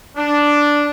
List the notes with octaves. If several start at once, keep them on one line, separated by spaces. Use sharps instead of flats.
D4